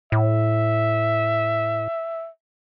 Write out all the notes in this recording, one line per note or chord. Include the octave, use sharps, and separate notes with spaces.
A2 E5